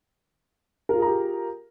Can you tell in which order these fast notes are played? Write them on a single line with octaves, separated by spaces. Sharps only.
A#4 F4 G#4 A#5 G4